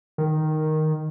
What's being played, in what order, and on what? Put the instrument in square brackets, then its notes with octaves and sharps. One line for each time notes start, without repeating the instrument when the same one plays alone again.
[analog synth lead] D#3